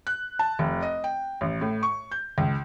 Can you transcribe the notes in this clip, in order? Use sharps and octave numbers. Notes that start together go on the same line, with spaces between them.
F#6
A5
F1
D#5
G5
A1
A2
C#6
G6
C#2